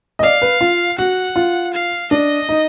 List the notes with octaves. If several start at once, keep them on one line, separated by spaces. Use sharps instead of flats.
D#5
D5 F5
B4
F4
F#4 F#5
F4
F5
D4 D#5
D#4